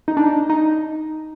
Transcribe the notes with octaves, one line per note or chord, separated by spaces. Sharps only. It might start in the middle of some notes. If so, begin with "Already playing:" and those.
D#4
D4
D#4
D#4